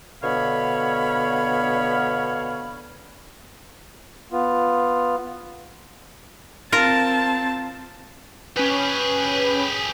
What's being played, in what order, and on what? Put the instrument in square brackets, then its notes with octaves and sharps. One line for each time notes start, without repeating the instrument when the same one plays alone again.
[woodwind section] B2 D3 B3 C#5 F5 B5
[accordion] B3 F4
[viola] C4 A5 [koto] F4 A#4
[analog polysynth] C#4 B4 [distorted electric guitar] G4 G#4